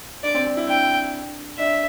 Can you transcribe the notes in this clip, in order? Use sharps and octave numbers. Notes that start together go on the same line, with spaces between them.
D4 D5
C4
C4
E4
D4 G5
D4 E5